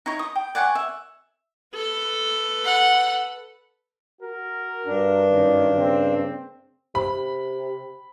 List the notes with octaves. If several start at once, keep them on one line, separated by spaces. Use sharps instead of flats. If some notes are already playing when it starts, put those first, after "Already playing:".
D#4 E4 C#5
D#6
G5
D5 F#5 G#5 C#6
E5
A4 B4
F#5
F#4 A#4
G2 D4
F#2 D#3
C#3 A#3 C4
C3 B5